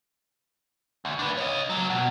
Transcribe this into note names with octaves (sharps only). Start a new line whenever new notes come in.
D2
D4 B4
C#5 D#5
C#2 F#3
B2